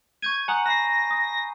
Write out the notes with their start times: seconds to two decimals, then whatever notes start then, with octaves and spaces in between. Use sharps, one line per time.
0.22 C#6 G6 G#6 D#7
0.48 F#5 G#5 A#5 D#6
0.66 A5 B5 A#6 C7
1.11 D#6